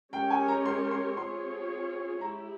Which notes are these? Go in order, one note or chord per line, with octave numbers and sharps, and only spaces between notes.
G#3 C#4 G4 A#4 C#5 G5
G#5
A#5
C6
C6
C4 F4 G#4 C#5 C6
G#3 E4 G4 A#5